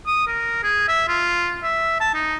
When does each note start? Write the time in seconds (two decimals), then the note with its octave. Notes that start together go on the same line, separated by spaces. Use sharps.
0.06 D#6
0.27 A#4
0.63 G#4
0.88 E5
1.08 F4
1.63 E5
2.00 A5
2.14 D#4